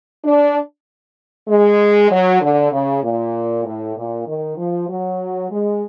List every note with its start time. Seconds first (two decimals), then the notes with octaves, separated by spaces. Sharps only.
0.25 D4
1.48 G#3
2.09 F#3
2.41 D3
2.72 C#3
3.03 A#2
3.65 A2
3.96 A#2
4.27 D#3
4.57 F3
4.89 F#3
5.51 G#3